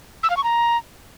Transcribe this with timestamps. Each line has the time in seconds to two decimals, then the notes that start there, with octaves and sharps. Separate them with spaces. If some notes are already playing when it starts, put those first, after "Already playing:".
0.23 E6
0.30 F5
0.37 C#6
0.44 A#5